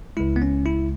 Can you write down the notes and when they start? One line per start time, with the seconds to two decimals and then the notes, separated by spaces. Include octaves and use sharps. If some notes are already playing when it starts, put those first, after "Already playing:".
0.17 C#2 C#3 G#3 E4
0.36 B3
0.42 C#4
0.66 E4